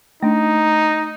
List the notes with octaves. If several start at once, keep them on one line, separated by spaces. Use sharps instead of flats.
A3 D4 D#4